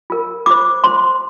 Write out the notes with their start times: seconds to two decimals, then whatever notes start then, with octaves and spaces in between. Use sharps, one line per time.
0.10 F4 A#4
0.46 F4 C5 D6
0.84 F4 C5 C6